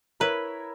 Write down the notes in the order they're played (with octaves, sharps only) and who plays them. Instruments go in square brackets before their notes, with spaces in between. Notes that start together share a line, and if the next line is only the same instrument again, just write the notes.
[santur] E4 A#4 C#5 E5 [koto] B4